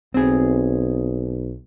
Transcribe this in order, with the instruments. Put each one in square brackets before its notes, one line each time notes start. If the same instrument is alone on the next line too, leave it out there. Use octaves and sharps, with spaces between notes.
[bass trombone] B1 [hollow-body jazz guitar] C4 G#4